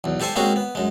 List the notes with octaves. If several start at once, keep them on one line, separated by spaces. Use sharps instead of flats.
B1 E2
G3 G4 A4 C5 G#5
G#3 A#3 C4 C#4 F#4 G#4
B3
F#2 G#3